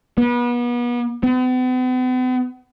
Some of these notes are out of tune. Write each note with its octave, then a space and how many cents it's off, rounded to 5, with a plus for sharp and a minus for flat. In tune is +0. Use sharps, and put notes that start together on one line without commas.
B3 -35
B3 +45